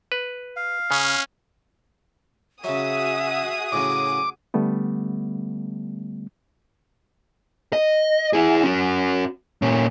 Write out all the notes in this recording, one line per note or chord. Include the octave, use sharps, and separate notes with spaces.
B4
F5
C#3 C#4
C#3 F#3 F#4 G#4 E5 D#6
A2 C#3 F#3 D6
D3 G3 A3 B3
D#5
E4 G#4
C#4 F#4
A#2 C#4